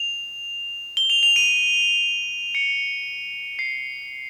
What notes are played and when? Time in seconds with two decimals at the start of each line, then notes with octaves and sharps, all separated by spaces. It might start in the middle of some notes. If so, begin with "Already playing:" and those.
Already playing: F7
0.97 G7
1.10 F7
1.23 F7
1.36 D#7
2.55 C#7
3.59 C7